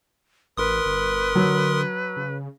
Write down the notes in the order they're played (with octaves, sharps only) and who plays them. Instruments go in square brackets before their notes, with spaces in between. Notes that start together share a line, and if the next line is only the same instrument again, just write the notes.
[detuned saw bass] A1 [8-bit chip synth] A#4 C6 D#6 [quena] B4
[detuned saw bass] G1
[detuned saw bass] D3 [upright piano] F#3
[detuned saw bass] C#3